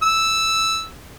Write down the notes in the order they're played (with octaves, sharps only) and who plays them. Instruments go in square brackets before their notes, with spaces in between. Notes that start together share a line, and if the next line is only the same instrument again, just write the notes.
[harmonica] E6